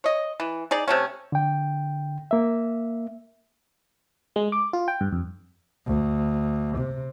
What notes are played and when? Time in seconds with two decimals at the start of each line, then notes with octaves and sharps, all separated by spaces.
0.04 C#5 D#5
0.40 E3
0.71 D#4 G#4 D5
0.88 C3 A3 C#4
1.32 D3 G5
2.31 A#3 E5
4.36 G#3
4.52 D6
4.73 F4
4.88 G5
5.01 G2
5.13 F2
5.86 D2
6.78 C3